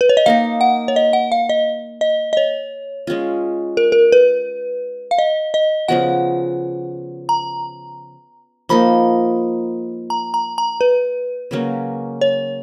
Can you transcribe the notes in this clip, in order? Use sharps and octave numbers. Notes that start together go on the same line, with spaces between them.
B4
C#5
D#5
A#3 D#4 A#4 F5
F#5
C#5
D#5
F#5
F5
D#5
D#5
D#5
C#5
G#3 C#4 F4
A#4
A#4
B4
F5
D#5
D#5
C#3 F3 B3 F#4 F#5
A#5
F3 A#3 D#4 B5
A#5
A#5
A#5
B4
C#3 F#3 A#3 C#4
C#5